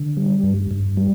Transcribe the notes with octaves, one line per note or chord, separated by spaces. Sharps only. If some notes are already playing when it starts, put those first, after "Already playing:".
Already playing: D3
G3
G2
G2
G3